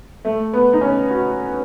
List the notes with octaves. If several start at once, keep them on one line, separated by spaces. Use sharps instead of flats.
A3
B3
D#4
C#4
F#4